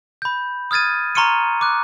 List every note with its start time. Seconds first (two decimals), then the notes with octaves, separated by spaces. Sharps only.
0.22 B5 G6
0.71 D#6 F6 G#6 A6 D#7
1.15 A#5 C6 C#6 F6 C#7 D#7
1.61 D6 F#6